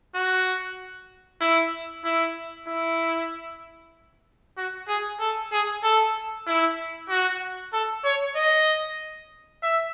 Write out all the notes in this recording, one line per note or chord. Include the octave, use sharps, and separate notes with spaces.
F#4
E4
E4
E4
F#4
G#4
A4
G#4
A4
E4
F#4
A4
C#5
D#5
E5